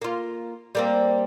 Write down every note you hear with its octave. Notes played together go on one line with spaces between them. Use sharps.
A#3 F4
G3 A#3 C4